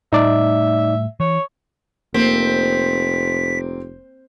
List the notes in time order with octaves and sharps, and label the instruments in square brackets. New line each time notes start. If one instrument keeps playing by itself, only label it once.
[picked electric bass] A2 G3 A3 [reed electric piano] D#4 D5 [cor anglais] E5
[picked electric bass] E3 [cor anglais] C#5
[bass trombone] F1 [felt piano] A#3 C5 [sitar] C4 [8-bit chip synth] B6